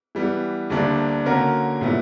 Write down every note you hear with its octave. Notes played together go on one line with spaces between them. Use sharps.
E3 G3 B3
D2 D3 G3 A#3 D4
D3 A#3 C#4 F#4 A#4
A#2 G3 B3 E4